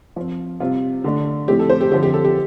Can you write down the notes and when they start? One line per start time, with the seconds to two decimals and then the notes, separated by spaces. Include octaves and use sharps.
0.16 F3 C4
0.60 C3 G3 C4 F4
1.04 D3 A3 D4
1.48 A2 F3 A3 C4 G4
1.59 A4
1.70 C5
1.81 G4
1.91 D3 F3 C4 G4
2.03 G4
2.14 A4
2.25 G4